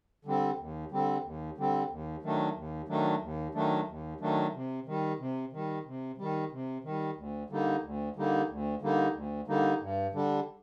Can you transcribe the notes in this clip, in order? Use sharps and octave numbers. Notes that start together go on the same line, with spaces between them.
D3 G3 C4
D#2
D3 G3 C4
D#2
D3 G3 C4
D#2
D#3 F#3 A3 D4
D#2
D#3 F#3 A3 D4
D#2
D#3 F#3 A3 D4
D#2
D#3 F#3 A3 D4
C3
D#3 G3
C3
D#3 G3
C3
D#3 G3
C3
D#3 G3
D2
D3 G3 A#3 D#4
D2
D3 G3 A#3 D#4
D2
D3 G3 A#3 D#4
D2
D3 G3 A#3 D#4
G2
D3 G3 D4